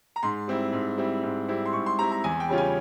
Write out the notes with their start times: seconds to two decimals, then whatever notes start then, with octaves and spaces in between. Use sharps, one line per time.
0.16 A#5
0.23 G#2 C6
0.48 G3 C4 E4
0.73 G#2
0.98 G3 C4 E4
1.23 G#2
1.48 G3 C4 E4
1.65 C6
1.73 G#2 C#6
1.86 C6
1.99 G3 C4 E4 A#5
2.12 A#5
2.24 E2 G#5
2.40 G5
2.49 C#3 G3 C#4 F4
2.58 G#5